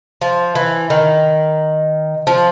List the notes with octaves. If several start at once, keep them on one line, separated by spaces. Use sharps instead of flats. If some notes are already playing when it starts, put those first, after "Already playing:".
F3
E3
D#3
F3